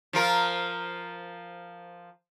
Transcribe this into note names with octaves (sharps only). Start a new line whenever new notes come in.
F3 F4 A#4